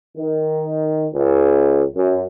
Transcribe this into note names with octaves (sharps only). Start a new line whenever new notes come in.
D#3
C#2
F#2